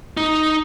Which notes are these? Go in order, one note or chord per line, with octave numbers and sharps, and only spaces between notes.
D#4